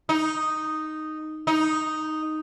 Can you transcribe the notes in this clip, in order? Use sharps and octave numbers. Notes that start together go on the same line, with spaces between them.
D#4
D#4